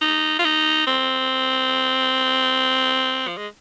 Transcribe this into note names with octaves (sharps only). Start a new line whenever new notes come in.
D#4
F4
D#4
C4
F3
G#3